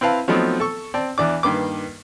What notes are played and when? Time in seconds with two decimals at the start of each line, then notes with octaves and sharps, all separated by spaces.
0.01 C4 E4 B4 F5 A5
0.28 F3 F#3 A3 B3 C4 D#4
0.60 A4 C#6
0.94 C4 D5 A5
1.18 E2 E3 D4 D6
1.43 G2 D#3 A#3 B4 D6